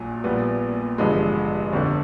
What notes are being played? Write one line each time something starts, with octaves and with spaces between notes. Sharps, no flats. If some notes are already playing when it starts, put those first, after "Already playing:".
Already playing: A#1 A#2 F#3
A#1 A#2 G3 B3
A1 G2 D3 F3 G#3
G1 F2 D3